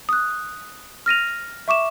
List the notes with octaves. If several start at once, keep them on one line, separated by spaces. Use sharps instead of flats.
D#6 F#6
F6 A#6 D#7 F7
E5 C#6 D6 E7